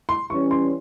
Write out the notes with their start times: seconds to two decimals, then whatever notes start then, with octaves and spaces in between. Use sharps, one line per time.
0.09 C6
0.30 E3 G3 C#4 C#6
0.51 C6